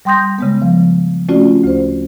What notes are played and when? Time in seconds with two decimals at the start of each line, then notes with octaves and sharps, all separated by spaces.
0.05 G3 G5 C6 D#6 G6 A#6
0.38 C#3 G#3 B3
0.62 F3
1.29 A3 C4 C#4 F4 F#4 D5
1.64 D2 C5